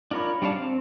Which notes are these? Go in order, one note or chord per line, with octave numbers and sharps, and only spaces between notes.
D4 F4 A#4 C#5 B5
G3 D4 C#5 F5 A5
C4